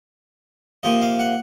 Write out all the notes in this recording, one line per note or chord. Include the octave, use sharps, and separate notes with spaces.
C3 F3 A#3 D#5
F5
F#5